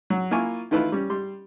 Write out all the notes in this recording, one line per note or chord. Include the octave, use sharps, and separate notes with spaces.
F#3
A#3 E4 F4 G#5 C#6
D#3 E3 A3 E4 F4 B4
G3 C#4
G3 C6